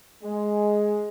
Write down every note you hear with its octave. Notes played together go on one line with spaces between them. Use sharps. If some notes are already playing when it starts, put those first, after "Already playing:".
G#3